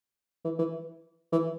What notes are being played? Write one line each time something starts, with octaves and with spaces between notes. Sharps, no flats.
E3
E3
E3